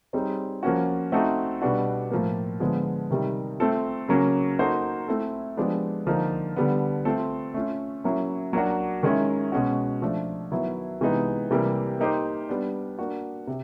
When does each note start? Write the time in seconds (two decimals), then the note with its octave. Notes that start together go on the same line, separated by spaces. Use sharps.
0.13 G3 C4 D#4 G#4 C#5
0.63 F3 A#3 C#4 F#4
1.12 A3 C4 D#4 F#4 A4
1.62 B2 G3 B3 D4 F#4
2.11 A2 F3 A#3
2.60 D3 F3 G#3 B3
3.10 C3 D#3 G3
3.60 A3 C4 F4 A4
4.08 C#3 F#3 A#3 C#4
4.59 A#3 D#4 F#4 A4 C5
5.08 A3 C4 E4 A4
5.57 F3 G#3 B3 D4 G4
6.06 D3 F3 A#3 D#4
6.56 D3 G3 B3
7.05 A3 C4 F4 A4
7.54 A3 C#4 F4
8.04 F#3 A#3 C#4 E4
8.53 F#3 A#3 D4 F#4
9.03 D#3 G#3 C#4 E4
9.52 B2 G#3 C#4 F#4
10.02 F3 A3 D4
10.51 D#3 F#3 B3 E4
11.01 C3 E3 G#3 B3 D#4
11.51 C3 E3 G3 A#3
12.00 A#3 D#4 G4 C5
12.49 G3 B3 D4
12.99 A#3 D4 F#4
13.47 C3